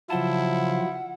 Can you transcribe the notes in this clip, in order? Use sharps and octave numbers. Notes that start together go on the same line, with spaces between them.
C#3 F3 F#3 E4 F4 C5 F#5 A5